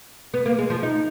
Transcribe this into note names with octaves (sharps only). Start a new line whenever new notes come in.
B3
A#3
G#3
F3
D#4